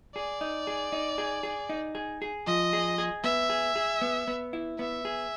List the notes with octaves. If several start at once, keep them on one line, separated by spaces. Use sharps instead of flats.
G#4 D5
D#4
G#4
D#4
G#4
G#4
D#4
G#4
G#4
F3 D#5
G#4
G#4
B3 E5
G#4
G#4
B3
B3
E4
B3 E5
G#4